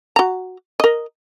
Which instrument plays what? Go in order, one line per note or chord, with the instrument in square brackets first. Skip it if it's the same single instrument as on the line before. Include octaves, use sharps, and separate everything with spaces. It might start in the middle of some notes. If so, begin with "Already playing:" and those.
[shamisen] F#4 A#5
A#4 D#5